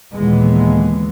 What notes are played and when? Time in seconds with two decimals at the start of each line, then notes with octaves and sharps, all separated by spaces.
0.14 D#2 A#2 D3 E3 G#3 B3